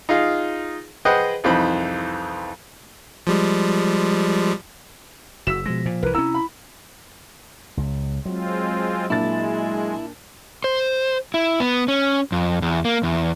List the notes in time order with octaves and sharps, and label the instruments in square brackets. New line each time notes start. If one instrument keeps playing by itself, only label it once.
[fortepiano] D#4 F4 G#4 F5
G#4 B4 C5 D#5 F#5 G5
C2 F2 E3 D#4 C5 B5
[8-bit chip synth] F3 G3 G#3
[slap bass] F#1 [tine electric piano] F#4 [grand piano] E6 B6 E7
[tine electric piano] B2 F3 A#6 [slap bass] G#3
[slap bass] A#2 [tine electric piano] F3
[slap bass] C2 E3 [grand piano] A#4 [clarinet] B4
[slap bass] C3 C#4 [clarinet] E4 [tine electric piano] A#5 [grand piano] E6
[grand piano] B5
[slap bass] C#2
[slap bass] F#3 [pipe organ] G#3 C4 F4
[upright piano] A#2 D4 A6 [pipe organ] G#3 [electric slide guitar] E4
[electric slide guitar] C5
E4
B3
C#4
F2
E2
A#3
E2